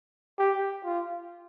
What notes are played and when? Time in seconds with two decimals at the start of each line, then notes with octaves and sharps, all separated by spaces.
0.39 G4
0.85 F4